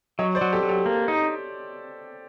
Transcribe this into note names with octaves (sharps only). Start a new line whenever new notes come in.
F#3 C#5 D#5
C5 D5
F#3
G4 A4
F#3
G4 A4
A#3
D#4